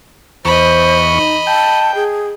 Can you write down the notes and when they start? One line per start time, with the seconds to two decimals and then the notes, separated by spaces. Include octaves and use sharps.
0.45 E2 C5 D#5 B5 C#6
1.13 D#4
1.47 G5 A5
1.95 G#4